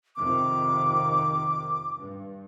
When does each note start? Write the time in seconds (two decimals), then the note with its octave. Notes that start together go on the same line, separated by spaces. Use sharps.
0.16 F2 C3 D#3 D6
1.97 G2